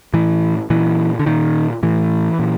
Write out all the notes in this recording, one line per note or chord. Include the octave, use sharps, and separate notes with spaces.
A2 E3
A#2 E3
D3
A#2 D#3
A2 E3
A#2